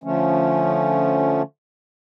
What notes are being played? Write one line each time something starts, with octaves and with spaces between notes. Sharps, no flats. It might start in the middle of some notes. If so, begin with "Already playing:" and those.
D3 F3 A3 C#4